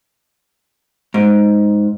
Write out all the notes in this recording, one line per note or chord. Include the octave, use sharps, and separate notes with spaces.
G#2